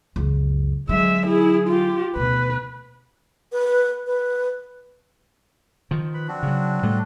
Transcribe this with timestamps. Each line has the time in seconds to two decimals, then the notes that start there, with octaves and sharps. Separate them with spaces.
0.16 C#2 F#2
0.89 D3 F#3 G#3 E5
1.27 E4 G#4
1.68 F4 G4
2.16 D2 B2 B4
3.52 B4
4.07 B4
5.91 D#3 F3
6.14 B4 B5
6.28 C4 D4 F#4
6.43 C#3 F#3
6.83 A2 G3 A3